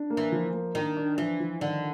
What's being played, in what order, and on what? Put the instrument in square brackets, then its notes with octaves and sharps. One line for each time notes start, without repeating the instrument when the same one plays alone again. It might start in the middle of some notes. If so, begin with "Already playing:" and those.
Already playing: [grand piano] D4
A#3
[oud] E3
[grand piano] F3
A#3
[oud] D#3 [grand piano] D4
[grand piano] D4
[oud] E3 [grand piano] F3
[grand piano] F3
[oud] D3 [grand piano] D#3